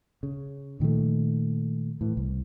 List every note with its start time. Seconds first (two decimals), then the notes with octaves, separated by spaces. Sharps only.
0.23 C#3
0.80 A#2 D#3 F3 A3
2.01 A2 E3
2.17 C2